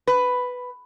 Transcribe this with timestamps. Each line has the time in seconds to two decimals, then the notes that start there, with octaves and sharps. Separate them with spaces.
0.07 B4